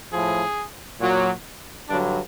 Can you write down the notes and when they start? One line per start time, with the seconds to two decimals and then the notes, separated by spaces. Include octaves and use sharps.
0.12 A2 F3 G#4
1.01 A#2 F#3
1.89 G2 D3 F#3 D4